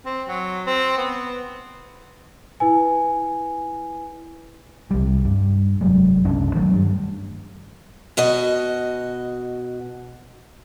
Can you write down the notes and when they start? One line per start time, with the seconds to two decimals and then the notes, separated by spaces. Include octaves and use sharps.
0.05 C4
0.28 F#3
0.67 C4
0.98 B3
2.60 E4 B4 G#5
4.91 C2 G3
5.25 G2
5.81 F1 F#3 G#3
6.24 F#1 C2 C#4 D4
6.55 D#3 F#3 A3
6.74 G2
8.17 B2 F#4 D#5